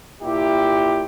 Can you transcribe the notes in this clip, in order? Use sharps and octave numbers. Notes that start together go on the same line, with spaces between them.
A#2 E4 G4